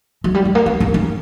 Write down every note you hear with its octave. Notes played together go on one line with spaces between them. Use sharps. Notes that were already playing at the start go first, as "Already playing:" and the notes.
F#3
G3
G#3
A#3
C4
D4
C#4